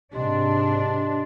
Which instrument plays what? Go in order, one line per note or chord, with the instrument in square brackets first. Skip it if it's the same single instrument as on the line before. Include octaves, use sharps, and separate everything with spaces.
[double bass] G#2 C3 [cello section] D4 [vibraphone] G4 D#5 C6